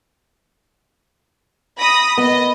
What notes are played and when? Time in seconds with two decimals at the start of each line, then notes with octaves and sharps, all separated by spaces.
1.78 B5 D#6 A#6
2.18 B3 D#5